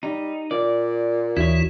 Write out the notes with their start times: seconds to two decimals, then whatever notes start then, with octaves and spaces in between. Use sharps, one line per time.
0.03 G3 D#4
0.51 A#2 D5
1.37 D#2 E3 E4 F#4 C#5